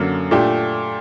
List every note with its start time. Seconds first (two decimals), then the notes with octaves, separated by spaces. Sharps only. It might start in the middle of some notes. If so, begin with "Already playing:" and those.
Already playing: F#2 D3 F#3 A#3
0.31 A#2 A3 D4 G4